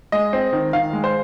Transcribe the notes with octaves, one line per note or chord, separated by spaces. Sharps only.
G#3 D#5
C4
D#3
D#3 F5
G#3
C5